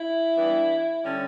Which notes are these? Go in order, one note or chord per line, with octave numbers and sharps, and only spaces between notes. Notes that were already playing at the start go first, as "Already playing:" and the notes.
Already playing: E4
E3 G3 B3 D4
D3 G3 C#4